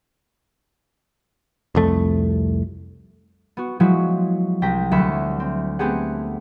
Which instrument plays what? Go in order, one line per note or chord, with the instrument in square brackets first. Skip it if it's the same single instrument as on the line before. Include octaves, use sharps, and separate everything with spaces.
[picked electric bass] C2 F2 A3
[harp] B3 F#4
F3 F#3 G#3 E4 F#4
C2 G5 A#6 B6
D2 F#3 E5 F#5 B5
C4
A3 B3 C4 G4 G#4 F#5